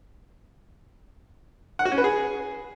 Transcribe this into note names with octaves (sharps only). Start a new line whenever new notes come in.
F#5
F#4
C#4
B4
G#4